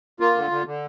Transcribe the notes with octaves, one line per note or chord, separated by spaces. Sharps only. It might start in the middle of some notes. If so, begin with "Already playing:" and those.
A#3 F4
D3
D3
D3